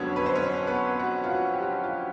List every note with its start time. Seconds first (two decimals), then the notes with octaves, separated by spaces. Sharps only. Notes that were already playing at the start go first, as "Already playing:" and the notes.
Already playing: F2 D3 F#3 B3 C#4 C#5
0.16 B4
0.26 C5
0.35 C#4 C#5
0.67 B3 B4
0.99 F#4
1.24 F4
1.30 F#4
1.54 G4
1.63 F#4
1.84 F4